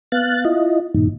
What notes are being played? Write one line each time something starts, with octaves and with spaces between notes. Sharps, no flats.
B3 F5 F#6 A6
E4 F4 D#5
G2 A#2 D#3